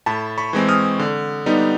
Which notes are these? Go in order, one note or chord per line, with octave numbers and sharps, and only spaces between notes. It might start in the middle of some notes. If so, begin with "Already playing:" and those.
A2 A5 B5
B5 C#6
E3 G#3 C4
D#6 F6
D3
G3 B3 D#4